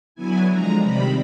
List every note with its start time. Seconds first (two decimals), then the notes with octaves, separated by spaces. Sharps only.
0.15 D3 F#3 B3 E4 G#5
0.49 D3 F3 G#3 A#5
0.81 C3 D#3 G3 C4 B5